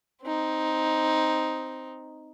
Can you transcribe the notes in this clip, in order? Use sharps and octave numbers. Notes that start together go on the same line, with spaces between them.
C4 D#4